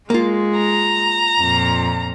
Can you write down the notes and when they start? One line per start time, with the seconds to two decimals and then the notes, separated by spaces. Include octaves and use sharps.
0.10 G#3 A#3 F4
0.58 A#5
1.41 F2 A#2